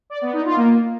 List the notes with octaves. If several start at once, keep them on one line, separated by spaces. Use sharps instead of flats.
D5
B3
D#4
F4
A#3